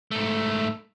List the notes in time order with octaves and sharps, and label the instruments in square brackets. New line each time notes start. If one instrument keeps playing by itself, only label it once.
[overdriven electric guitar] G#2 A3